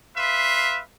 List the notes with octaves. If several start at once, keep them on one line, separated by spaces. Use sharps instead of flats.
B4 E5 F5 C6